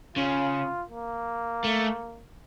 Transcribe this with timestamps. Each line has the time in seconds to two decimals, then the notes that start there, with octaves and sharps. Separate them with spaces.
0.16 C#3 F4
0.90 A#3
1.64 A3